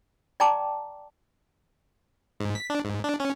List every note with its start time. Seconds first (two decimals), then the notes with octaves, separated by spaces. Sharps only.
0.40 D5 G5 A5 A#5 D6
2.40 G#2
2.55 B6
2.70 D4
2.85 G#2
3.04 D4
3.20 C#4